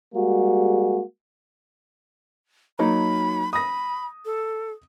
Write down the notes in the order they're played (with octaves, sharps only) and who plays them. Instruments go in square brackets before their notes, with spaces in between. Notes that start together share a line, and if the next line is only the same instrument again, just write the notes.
[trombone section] G3 G#3 A#3 F#4 G#4
[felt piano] F#3 A#3 D#4 [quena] B5
[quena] B5 [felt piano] D#6 A#6
[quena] A4